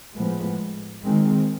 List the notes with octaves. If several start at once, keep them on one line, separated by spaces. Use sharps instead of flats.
A2 F3 G#3 B3
D#3 G#3 C4